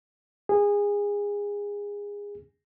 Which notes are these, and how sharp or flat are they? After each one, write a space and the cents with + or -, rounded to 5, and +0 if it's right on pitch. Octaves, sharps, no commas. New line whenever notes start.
G#4 -25